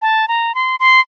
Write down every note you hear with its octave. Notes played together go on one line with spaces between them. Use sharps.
A5
A#5
C6
C6